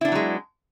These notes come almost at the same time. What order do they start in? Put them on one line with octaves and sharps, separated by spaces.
E4 D4 B3 F#3 G#3